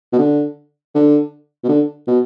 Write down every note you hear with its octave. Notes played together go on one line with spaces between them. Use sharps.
B2
D3
D3
B2
D3
B2